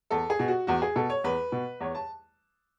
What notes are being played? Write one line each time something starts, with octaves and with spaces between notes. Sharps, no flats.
E2 A4
G#4
B2
F#4
E2 F#4
G#4
B2 A4
C#5
E2 B4
B2
E2 C#5
A5